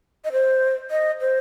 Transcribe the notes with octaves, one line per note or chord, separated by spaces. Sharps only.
D#5
C5
D#5
C5